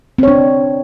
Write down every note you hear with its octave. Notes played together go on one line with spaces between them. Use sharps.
C4 D4 C#5